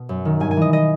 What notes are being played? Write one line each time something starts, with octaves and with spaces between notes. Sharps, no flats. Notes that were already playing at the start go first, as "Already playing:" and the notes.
Already playing: B2
F#2
D#3
G2 G#5
G#5
E3 D#5
D#5